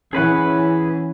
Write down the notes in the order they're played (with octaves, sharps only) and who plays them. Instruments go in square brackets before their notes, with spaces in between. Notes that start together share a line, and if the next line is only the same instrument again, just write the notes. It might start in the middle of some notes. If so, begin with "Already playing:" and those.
[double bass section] E3 C#4 [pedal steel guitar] G#4 B4 F#5